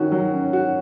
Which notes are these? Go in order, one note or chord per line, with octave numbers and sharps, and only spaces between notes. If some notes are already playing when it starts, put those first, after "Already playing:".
Already playing: D#3 C#4 F#4
F#3
C#4
F#4